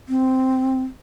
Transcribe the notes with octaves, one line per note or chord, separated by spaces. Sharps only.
C4